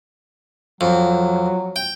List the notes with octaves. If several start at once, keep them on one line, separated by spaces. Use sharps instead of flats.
F2 F#3
G5